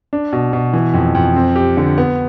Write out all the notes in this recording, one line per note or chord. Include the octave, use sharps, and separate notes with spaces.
D4
B2
B2
E3
F2
F2
C4
G4
D3
B3